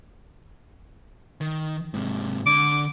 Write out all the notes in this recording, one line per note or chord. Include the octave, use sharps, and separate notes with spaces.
D#3
G#2 C3
D3 D6